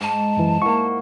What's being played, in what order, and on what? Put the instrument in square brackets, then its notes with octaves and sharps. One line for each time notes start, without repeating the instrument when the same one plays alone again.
[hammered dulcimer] G#2 [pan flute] A5
[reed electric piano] F#2 E3
[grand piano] A#3 E4 [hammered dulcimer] F#5 [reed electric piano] C#6